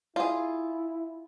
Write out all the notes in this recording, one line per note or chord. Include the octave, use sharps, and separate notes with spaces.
E4 F4 G#4